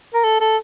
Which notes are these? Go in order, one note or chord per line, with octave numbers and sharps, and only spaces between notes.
A#4
A4
A4